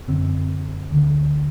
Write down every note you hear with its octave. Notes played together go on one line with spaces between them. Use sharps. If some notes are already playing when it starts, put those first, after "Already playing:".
F#2 D3 C4
D2 D3